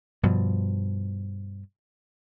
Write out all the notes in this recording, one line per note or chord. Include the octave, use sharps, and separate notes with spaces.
G2 B2 F3